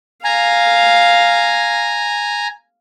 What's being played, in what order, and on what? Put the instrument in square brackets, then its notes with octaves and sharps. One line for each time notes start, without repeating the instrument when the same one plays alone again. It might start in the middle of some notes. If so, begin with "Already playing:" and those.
[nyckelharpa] F5 [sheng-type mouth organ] G#5 A#5